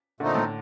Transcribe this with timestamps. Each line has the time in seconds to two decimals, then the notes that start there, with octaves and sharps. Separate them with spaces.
0.20 A#2 D3 A3 C4 D#4
0.35 A2